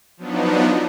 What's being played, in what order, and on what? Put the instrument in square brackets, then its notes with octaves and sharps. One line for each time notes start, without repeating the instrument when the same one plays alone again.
[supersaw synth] F3 F#3 B3 D4 D#4